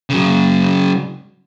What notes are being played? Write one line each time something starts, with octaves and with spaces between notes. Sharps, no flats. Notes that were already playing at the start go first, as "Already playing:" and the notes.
C#3 F#3